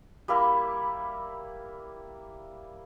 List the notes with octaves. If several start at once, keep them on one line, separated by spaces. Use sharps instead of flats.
G3 A#3 E4 A#4